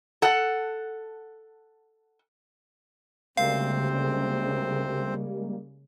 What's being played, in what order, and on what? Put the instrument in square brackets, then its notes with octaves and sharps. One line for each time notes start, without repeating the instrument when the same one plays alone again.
[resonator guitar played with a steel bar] A4 F#5
[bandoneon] D2 C4 C5 [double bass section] C#3 [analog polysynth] G3 G#3 A#3 [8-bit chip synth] F5